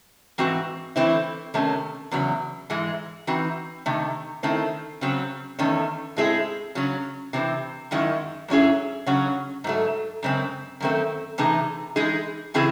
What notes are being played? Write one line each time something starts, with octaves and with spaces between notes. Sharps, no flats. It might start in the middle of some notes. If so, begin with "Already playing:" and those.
G#2 E3 C4 F#4
E3 A3 C4 E4
C3 D#3 A3 C#4
E2 C#3 F#3
G#2 E3 G#3
E3 C4 D#4 F#4
C3 D#3 A3
D#3 A3 C4 E4
C#3 F#3 C4
E2 D#3 A3 C#4
A2 G#3 C4 E4 G#4
C#3 F#3 C#4
C3 E3 C4
F#2 D#3 G#3 C#4 E4
G#2 F#3 C#4 E4 G#4
C#3 F#3 C#4 F#4
G#2 F#3 A3
F#2 C#3 G#3 C4
F#2 D#3 A3 C4
C3 E3 A3 D#4 G#4
E3 G#3 D#4 G#4
C#3 E3 C4 E4 G#4